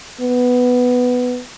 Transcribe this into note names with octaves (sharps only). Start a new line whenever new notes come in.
B3